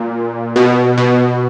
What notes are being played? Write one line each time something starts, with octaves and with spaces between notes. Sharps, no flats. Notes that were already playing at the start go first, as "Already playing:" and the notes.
Already playing: A#2
B2
B2